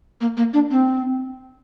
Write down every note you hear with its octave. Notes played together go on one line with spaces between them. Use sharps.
A#3
A#3
D4
C4